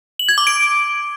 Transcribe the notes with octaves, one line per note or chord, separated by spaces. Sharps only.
F#7
G#6
D6
D7